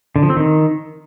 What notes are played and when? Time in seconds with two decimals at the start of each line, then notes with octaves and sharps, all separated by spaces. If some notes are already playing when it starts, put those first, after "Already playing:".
0.16 D3
0.23 F3
0.30 C4
0.37 D#3